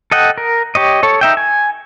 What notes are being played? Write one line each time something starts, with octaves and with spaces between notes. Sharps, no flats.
A4 D#5 F#5 G5
A#4
G4 C#5 D#5
A4 C#5
D#4 E5 G5
G#5